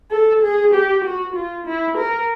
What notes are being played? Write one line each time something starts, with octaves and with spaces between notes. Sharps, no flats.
A4
G#4
G4
F#4
F4
E4
A#4